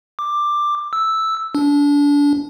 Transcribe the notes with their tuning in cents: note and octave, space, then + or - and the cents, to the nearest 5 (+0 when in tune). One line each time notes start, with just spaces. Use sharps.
D6 +10
E6 -5
D4 -30